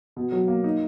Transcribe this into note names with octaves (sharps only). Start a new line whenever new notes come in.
B2
F#3
A#3
D#4